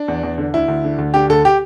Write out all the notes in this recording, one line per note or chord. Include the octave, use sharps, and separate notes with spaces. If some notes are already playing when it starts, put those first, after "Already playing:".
Already playing: D4
E2
E2
D3
D2 E4
D2
D3
D2
D3 G4
D2 A4
G4